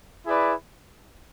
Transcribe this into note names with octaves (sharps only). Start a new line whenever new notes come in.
E4 G#4 B4 D5